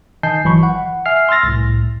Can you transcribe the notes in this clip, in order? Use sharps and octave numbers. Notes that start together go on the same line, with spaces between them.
D#3 D#5 G#5 A5 G6 C7
G1 E3 F#3 B5 C#6
F#5
E5 G#5 F6 C7
C6 E6 F6 A6 A#6
C2 A2